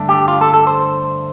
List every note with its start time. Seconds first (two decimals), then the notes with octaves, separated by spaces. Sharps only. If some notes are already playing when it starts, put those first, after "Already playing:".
Already playing: G2 D3 A3 D4
0.09 G4
0.28 F4
0.41 A4
0.54 A4
0.67 C5